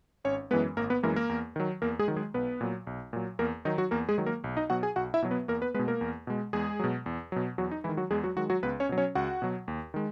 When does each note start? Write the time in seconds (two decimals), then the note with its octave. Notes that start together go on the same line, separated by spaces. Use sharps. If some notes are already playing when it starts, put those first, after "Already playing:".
0.25 G#1 C#4 C#5
0.51 F#2 E3 G#3 B3 B4
0.77 G#1 A#3 A#4
0.90 B3 B4
1.03 F#2 E3 G#3 A#3 A#4
1.16 A#3 A#4
1.29 E2
1.56 D#3 F#3
1.82 E2 A#3 A#4
1.99 G#3 G#4
2.08 D#3 F#3
2.17 G#3 G#4
2.34 B1 B3 B4
2.61 A#2 F#3
2.87 B1
3.13 A#2 F#3
3.39 E2 A#3 A#4
3.65 D#3 F#3 D#4
3.78 F#3 F#4
3.91 E2 A#3 A#4
4.09 G#3 G#4
4.18 D#3 F#3
4.26 A#3 A#4
4.44 B1
4.57 D#4 D#5
4.70 B2 F#3 F#4 F#5
4.83 G#4 G#5
4.96 B1 F#4 F#5
5.14 E4 E5
5.22 B2 F#3
5.31 B3 B4
5.48 E2 A#3 A#4
5.61 B3 B4
5.74 G#3 B3 B4
5.79 B2
5.88 A#3 A#4
6.01 E2
6.27 B2 G#3
6.53 E2 G#3 G#4
6.79 B2 F#3
7.06 E2
7.32 B2 F#3
7.58 E2 F#3 F#4
7.71 D#4
7.84 D#3 E3 G#3 E4
7.97 F#3 F#4
8.11 E2 G#3 G#4
8.24 F#3 F#4
8.36 D#3 F#3 G#3 F#4
8.50 F#3 F#4
8.63 C#2 B3 B4
8.80 C#4 C#5
8.89 B2 F#3
8.98 C#4 C#5
9.15 C#2 F#4 F#5
9.42 B2 F#3
9.68 D#2
9.94 D#3 G#3